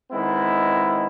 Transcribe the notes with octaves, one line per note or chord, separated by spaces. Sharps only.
D#3 G#3 B3 C4 E4